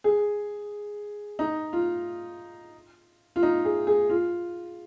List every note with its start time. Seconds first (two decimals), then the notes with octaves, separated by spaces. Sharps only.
0.04 G#4
1.39 D#4
1.73 F4
3.36 F4
3.43 D#4
3.65 G#4
3.87 G#4
4.10 F4